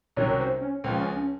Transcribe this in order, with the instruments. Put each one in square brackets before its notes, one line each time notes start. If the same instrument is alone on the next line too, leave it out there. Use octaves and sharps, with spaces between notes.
[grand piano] C2 C3 D#3 F#3 C#4 [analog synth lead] C#5
[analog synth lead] C5
C#4
[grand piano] C#2 C#3 F3 [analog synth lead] C4
[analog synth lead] C#4
C#4